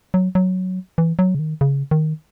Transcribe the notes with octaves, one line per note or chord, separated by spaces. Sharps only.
F#3
F#3
E3
F#3
C#3
D#3
C#3
D#3